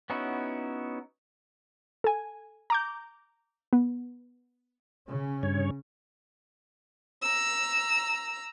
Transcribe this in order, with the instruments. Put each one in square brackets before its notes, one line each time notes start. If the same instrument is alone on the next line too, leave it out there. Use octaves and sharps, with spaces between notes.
[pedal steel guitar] B3 C#4 D#4 E4 F#4
[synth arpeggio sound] A4 G#5
A#5 D6 G6
B3
[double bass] C#3 C#4
[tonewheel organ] G2 C#5
[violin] A#5 E6